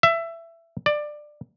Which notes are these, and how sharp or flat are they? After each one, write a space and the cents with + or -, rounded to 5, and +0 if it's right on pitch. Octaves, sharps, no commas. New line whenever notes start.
E5 +20
D5 +15